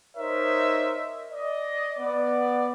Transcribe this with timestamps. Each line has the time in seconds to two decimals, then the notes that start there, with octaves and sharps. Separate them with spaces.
0.17 D#4 A#4 C5 C#5 D#5 E5
1.31 D5 D#5
1.98 B3 D5